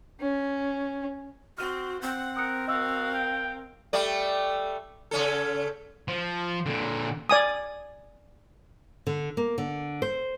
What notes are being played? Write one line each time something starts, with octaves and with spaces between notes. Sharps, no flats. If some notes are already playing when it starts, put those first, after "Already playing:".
C#4
C4 F#4 F6
C4 F#5
A#4 D#6 F#6 C#7
F#4 A#4 D#5 F5 E6
G5
G3 A3 D5
C#3 C#4 A4
F3
A#2 D3
D5 G#5 D#6
D3
A#3
D3
C5